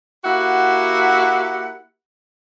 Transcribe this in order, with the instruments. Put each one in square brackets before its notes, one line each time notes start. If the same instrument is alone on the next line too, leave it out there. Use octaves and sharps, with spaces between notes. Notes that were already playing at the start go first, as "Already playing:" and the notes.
[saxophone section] A#3 E4 F#4 G4 F#5